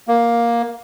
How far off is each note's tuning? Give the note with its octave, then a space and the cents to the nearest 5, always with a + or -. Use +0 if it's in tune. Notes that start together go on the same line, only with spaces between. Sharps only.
A#3 +10